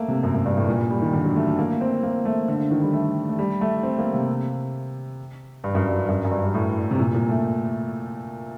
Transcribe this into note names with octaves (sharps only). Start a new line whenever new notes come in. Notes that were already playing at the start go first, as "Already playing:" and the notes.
Already playing: A3 A#3
C3
F#2
F#2
G2
A2
A#2
G3
D#3
D3
F#3
A3
A3
A#3
C4
A#3
A3
D3
D3
D#3
G3
A3
A3
G3
A3
C4
A#3
C3
G2
F#2
G2
F#2
F#2
G2
G2
A2
C3
A#2
A#2
A3